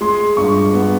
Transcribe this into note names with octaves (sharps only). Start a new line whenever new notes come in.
G#3 C6
G2 C#6
B3